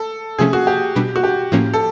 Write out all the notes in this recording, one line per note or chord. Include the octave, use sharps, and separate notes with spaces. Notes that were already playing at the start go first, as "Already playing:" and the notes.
Already playing: A4
C3 F3 A3 C#4 G#4
F#4
G4
B2 G3 B3 D4
F#4
G4
A2 F3 A#3 C#4
A4